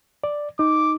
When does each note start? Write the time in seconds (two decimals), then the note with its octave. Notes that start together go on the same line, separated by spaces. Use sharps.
0.24 D5
0.59 D#4 D6